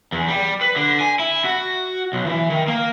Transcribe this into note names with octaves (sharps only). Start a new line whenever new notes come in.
E2
G3
B4
D3
G#5
E4
F#4
B1
E3
D#3
A#3